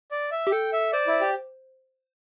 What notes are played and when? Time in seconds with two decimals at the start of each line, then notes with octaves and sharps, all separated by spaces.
0.11 D5
0.31 E5
0.47 G4
0.51 A4 G5
0.73 E5
0.92 C5 D5
1.07 E4
1.21 G4